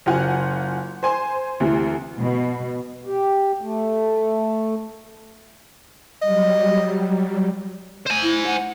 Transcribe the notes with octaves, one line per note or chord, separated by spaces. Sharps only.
F#1 F4 F#5 G#5
C5 G#5 C6
D2 C3 E3
B2
G4
A3
F#3 G3 D#5
C5 G#5
E4
F#5